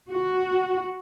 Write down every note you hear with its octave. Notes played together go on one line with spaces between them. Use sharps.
F#4